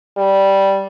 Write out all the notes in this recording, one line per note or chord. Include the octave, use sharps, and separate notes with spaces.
G3